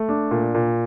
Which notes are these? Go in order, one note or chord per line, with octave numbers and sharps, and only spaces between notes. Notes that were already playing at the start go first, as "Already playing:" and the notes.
Already playing: A3
D4
A#2
A#2